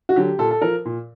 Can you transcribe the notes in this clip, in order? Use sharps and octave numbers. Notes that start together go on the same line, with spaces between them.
F#4
D3 F#3 G4
A#2 A4
A4
F3 A#4
A#2